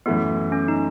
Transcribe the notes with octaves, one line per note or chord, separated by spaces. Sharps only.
F#2 E3 A3 B3 E4
C#4
D#4